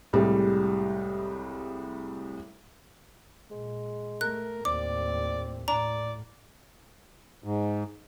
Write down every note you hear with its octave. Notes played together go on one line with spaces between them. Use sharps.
C2 A2 G3 G#3
A#2 G#3
A3 A#4 F#6
D#2 A2 C4 D5 D6
A2 D5 A#5
G#2